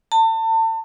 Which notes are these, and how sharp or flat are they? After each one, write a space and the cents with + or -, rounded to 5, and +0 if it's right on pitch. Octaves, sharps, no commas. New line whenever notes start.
A5 +35